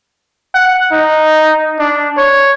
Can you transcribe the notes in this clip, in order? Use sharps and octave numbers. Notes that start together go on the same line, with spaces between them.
F#5
D#4
D4
C#5